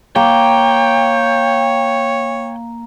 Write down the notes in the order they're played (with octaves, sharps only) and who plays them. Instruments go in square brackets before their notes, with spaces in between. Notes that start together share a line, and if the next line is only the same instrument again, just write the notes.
[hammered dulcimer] A#3 [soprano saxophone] C#5 [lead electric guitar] G5